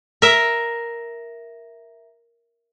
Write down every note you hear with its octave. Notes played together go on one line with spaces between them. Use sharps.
A#4 E5